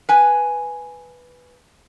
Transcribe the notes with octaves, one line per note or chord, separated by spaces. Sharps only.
B4 G#5